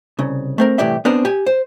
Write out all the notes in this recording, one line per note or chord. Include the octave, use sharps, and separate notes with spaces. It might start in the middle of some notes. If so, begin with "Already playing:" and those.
C2 C#3
A3 C4 A#4
C2 A2 E3 G4 D5 E5
B3 C4 D4 G#4 A#4 C5
G4 G#5
C5